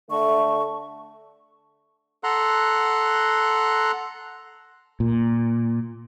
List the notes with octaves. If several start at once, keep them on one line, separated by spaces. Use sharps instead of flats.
D3 A3 C#6
A4 F#5 A#5 C6 F#6
A#2